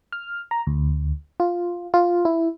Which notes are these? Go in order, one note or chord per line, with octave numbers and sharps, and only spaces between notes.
F6
A#5
D2
F4
F4
E4